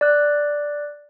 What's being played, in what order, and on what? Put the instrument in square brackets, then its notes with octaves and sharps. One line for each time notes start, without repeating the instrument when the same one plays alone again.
[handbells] D5 F#6